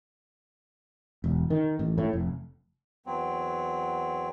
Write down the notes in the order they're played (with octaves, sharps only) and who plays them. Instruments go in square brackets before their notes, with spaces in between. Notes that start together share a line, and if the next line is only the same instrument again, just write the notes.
[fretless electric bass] E1
D#3
A1
A2
F1
[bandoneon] E2 F#3 C4